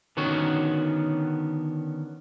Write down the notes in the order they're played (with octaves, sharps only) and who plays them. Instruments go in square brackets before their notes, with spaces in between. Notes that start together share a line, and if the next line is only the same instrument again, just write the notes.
[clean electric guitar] D3 D#3 B3 C#4 F#4